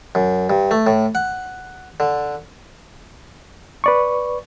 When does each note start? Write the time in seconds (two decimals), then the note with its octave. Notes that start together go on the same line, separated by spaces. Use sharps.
0.15 F#2
0.50 G2
0.71 A3
0.87 A2
1.15 F#5
2.00 D3
3.84 B4 D5 C#6